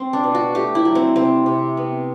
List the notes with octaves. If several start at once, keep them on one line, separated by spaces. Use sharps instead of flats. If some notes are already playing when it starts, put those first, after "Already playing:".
Already playing: C4
D4
B2
F#4
A3 G4
E4
F#3
C4
C3 C4
C3
B3